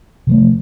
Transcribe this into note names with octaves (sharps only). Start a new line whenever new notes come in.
C3 F3 A3